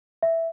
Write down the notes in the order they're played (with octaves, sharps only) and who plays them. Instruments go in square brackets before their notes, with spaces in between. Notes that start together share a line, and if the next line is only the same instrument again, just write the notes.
[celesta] E5